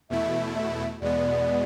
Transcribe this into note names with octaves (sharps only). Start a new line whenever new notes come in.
E2 B2 A3 E4 E5
E5
E2 B2 G#3 B3 D5